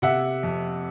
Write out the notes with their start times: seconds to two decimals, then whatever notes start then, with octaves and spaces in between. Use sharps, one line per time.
0.02 C3 E5 F#5
0.43 F2